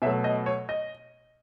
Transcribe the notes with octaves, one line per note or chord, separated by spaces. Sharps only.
B2 F#3 A3 E5
D#5
C#5
D#5